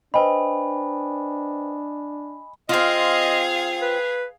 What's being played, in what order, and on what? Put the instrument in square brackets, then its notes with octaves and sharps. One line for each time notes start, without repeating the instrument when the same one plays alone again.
[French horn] D4 [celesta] B4 C5 G5 [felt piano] D#5 [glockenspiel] G#5 B5
[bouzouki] C4 F4 [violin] G#4 F5 [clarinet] D#5
[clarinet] B4